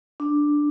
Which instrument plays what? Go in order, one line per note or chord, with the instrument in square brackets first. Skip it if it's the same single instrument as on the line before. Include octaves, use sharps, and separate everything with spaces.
[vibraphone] D4